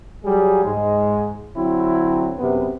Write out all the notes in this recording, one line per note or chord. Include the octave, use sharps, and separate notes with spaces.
F#3 G3 G#4
G#2 G#3
D3 F#3 C4 E4
F#2 C3 B3